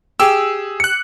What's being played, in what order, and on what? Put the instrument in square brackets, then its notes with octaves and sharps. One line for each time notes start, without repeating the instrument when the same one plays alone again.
[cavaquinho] G4 [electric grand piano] G#4 E6
[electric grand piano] F#6 C#7